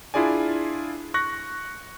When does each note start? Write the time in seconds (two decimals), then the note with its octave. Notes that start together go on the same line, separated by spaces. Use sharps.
0.14 D4 E4 F4 G#4 D5 G#5
1.14 C#6 F#6 A#6